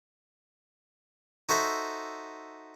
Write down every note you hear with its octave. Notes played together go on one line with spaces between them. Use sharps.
D#4 F#4 A4 C5 E5